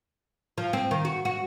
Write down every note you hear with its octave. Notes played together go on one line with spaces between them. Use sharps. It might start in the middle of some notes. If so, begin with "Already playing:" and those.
F3
C4
D#3
F#4
F#4